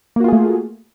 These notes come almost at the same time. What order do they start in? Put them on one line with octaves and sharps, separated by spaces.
A#3 F#4 F4 G#4 A3